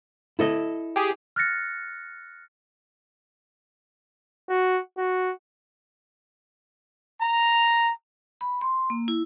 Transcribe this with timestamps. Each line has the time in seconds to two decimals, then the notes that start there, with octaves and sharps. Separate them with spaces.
0.39 E4 A4 D#5
0.96 G4 G#4
1.36 F6 F#6 A6 A#6 C#7
4.50 F#4
4.98 F#4
7.21 A#5
8.41 B5
8.61 C6
8.90 A#3
9.08 E4